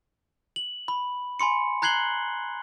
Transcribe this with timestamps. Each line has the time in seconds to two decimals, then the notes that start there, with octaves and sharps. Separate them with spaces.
0.56 F#7
0.88 B5
1.39 G#5 B5 C6 C#7
1.82 A#5 F#6 G#6 C7 F#7 G7